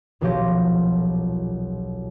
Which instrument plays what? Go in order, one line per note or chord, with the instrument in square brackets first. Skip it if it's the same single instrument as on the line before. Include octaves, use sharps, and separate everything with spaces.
[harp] D#1 B1 F3 F#3 G4 A#6